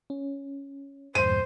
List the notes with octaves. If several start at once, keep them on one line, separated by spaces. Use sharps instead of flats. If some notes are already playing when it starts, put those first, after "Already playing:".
C#4
E2 G2 A#2 C5 D#7